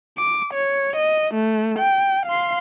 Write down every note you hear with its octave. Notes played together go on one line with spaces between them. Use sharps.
D6
C#5
D#5
A3
G5
F5 C6